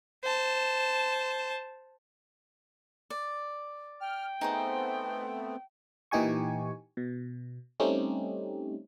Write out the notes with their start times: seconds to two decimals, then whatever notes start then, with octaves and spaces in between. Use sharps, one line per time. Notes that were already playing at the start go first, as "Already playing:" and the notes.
0.23 C5 A5
3.10 D5
4.01 G5 F6
4.41 A3 B3 C4 D#4 G#4 C5
6.11 A#2 E3 D#4 G4 G#5 C#6
6.97 B2
7.80 G3 A3 C4 C#4 D#4 G4